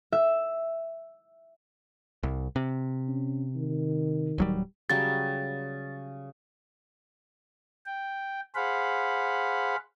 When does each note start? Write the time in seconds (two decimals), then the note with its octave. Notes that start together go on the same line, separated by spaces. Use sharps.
0.12 E5
2.23 C2
2.56 C3
3.09 C#4
3.56 D#3
4.38 D1 F#3 G3
4.90 C#3 F#3 G3 A6
7.86 G5
8.55 G#4 C5 F5 F#5 B5